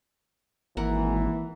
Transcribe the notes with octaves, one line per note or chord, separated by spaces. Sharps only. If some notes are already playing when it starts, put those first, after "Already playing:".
G#1 E3 A#3 A#4 F#5